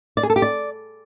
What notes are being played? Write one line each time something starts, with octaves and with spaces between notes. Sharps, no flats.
D5
G#4
A4
G4
D5